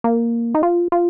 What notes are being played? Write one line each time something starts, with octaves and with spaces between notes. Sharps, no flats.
A#3
D#4
F4
F4